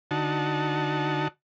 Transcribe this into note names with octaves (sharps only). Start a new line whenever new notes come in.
D3 D#4 F#4 A5